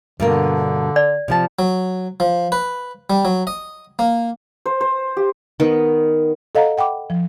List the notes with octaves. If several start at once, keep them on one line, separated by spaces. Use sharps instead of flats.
G2 B2 D3 A#3
D5
C3 F3 A5
F#3
F3
B4
G3
F#3
D#5
A#3
C5
C5
G4
D#3 B3
A4 D#5 F5 F#5 A#5
F#5 G5 B5 D6
F3